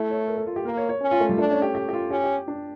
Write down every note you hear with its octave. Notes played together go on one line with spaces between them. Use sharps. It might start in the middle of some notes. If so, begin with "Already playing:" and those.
Already playing: A3 E4
C#5
A#4
A4
F4
G4
A#3 A#4
C#5
C#5
C#4
F4
A3
G3
A3 D4
C#4
G4
G4
G4
F4
C#4 G4
G4
D4